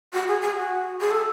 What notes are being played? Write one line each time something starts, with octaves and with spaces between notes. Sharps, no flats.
F#4
G#4
G#4
F#4
G#4
A4